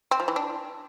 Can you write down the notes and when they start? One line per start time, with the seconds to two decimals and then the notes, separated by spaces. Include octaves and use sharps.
0.11 C4
0.20 F3
0.28 E3
0.36 D4